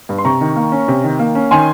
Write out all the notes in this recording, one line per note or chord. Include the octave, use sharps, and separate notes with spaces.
G2
C6
C3 A#5 C#6
D#3
A#3
C#4
C3
D#3
A#3
C#4
D#3 G#5 C6